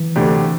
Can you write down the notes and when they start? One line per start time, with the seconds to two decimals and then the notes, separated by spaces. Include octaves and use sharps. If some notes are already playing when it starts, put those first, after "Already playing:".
Already playing: E3
0.16 D2 C3 A3 D4 G4